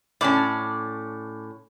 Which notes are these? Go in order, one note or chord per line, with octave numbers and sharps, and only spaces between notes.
A2 C#4 D5 A5